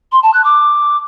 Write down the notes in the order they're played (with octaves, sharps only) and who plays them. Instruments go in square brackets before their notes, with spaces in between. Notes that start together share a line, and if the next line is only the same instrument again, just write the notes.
[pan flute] C6
A5
F#6
D6